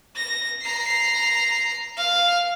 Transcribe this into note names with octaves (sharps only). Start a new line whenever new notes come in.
A#6
A#5 C7
F5